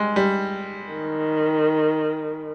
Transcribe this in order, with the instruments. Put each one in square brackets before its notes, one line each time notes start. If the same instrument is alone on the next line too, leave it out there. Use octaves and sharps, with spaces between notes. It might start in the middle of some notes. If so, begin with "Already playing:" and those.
Already playing: [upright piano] G3 G#3
G3
[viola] D#3